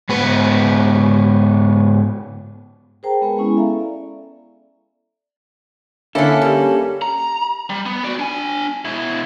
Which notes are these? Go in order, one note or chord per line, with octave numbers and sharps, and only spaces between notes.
G#2 B3 B4
G#4 A#4 C5 G5 A5 A#5
G#3 B3 G#4 B4 G#5
G#3 B3 C#4 E4
A4 E5 F5 A#5
D5
D3 A#3 C#4 E4 A4
G3 G4
A#5
G3
B3
F#4 D5
D4 G#5
B2 E4